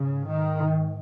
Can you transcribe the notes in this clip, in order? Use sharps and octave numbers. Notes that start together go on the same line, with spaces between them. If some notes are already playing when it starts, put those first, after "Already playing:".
Already playing: G#2 C#3
D#3